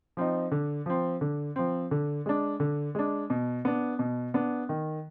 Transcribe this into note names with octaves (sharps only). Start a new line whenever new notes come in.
F3 C4 D#4
D3
F3 C4
D3
F3 C4
D3
G#3 D4
D3
G#3 D4
B2
B3 D4
B2
B3 D4
D#3